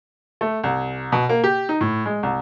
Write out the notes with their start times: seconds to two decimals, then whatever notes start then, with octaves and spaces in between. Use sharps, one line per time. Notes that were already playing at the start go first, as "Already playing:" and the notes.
0.41 A3
0.64 C2
1.12 B2
1.29 A#3
1.44 G4
1.69 D#4
1.81 A2
2.06 G#3
2.23 C2